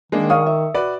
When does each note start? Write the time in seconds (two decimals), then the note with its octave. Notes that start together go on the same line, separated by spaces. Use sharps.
0.12 D#3 G#3 A#3 D4
0.30 G#4 D5 F5 C#6 D#6
0.46 E5
0.74 F#4 B4 D5